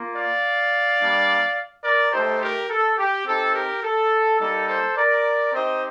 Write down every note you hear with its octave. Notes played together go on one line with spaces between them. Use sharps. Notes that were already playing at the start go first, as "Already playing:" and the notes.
Already playing: A#3 F4
D5 F5
G3 A#3 D4
A#4 D5
A3 D#4 G4 A4 C5
G4 A#4
A4
G4
C4 D#4 G4 A4
G4 A#4
A4
G3 A#3 D#4 A4
A4 C5
A#4 D5
C4 D#4 G4 C5 D#5